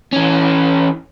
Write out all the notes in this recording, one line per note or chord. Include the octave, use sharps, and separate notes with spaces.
E3 C#4